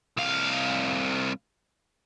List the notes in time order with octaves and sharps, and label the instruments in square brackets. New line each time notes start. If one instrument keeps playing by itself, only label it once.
[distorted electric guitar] C2 F5